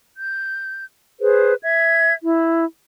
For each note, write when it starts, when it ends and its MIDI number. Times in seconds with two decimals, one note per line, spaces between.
0.17 0.84 91
1.20 1.54 68
1.20 1.54 71
1.20 1.54 72
1.63 2.14 76
1.63 2.14 92
2.23 2.65 64